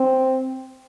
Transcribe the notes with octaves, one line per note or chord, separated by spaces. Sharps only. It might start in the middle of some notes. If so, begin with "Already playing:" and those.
Already playing: C4